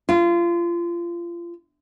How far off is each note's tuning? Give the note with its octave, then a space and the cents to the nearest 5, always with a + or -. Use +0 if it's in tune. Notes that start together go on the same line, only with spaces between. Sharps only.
F4 -25